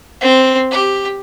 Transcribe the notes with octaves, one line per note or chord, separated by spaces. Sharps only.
C4
G4